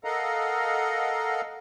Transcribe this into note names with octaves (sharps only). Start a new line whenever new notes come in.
A4 A#4 D#5 F5 F#5 A#5